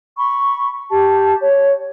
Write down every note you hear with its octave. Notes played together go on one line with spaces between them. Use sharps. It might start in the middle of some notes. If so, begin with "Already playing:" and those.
B5 C#6
G4 A5
C#5